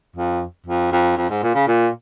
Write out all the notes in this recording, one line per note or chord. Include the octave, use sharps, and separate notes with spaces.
F2
F2
F2
F2
G#2
A#2
C#3
A#2